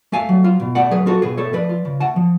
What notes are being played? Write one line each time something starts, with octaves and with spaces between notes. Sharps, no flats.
A3 F5 G#5
F#3
F4
B2
A3 D5 F#5
F#3 G#4 B4
F4 F#4 A4
B2 G#4 B4
A3 A4 C#5
F3 B4 D5
F4
C#3
A3 F#5 A5
F3